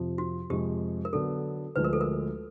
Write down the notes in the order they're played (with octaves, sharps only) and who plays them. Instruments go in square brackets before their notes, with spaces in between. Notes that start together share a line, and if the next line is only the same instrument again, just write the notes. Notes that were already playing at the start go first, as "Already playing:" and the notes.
Already playing: [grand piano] F2 C3 F3
[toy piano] F#4
[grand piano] F2 C3 F3 G#3 [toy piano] G4
[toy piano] A#4
[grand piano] D3 F#3 B3 D4 [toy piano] A4
[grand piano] D2 D3 F3 G#3 [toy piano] B4
[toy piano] A#4
A4
A#4